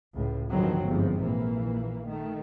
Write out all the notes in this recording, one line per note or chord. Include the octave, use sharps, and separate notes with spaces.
C#2 A2
G2 D3 D#3 F3 F#3 C4
G1 G#2 C3 F3
A#1 E3 A#3
D#3 A3